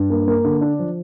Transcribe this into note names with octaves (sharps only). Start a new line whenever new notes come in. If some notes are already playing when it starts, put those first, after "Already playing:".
Already playing: G2
A#3
A#3
D3
D4
F3